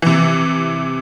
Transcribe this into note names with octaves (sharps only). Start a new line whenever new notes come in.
C3 E3